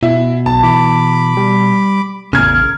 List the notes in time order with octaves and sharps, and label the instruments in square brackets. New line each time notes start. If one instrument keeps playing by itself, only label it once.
[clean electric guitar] B2 [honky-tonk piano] E4
[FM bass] B1 [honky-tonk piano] A5
[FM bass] E3 [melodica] B5 D6
[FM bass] G3
[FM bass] A1 [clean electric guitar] E2 C#3 [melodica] A#4 [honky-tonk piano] F6 G#6